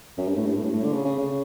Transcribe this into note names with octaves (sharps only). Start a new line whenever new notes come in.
F#2
G2
A2
G2
A2
G2
A2
D3
C#3
C#3
C#3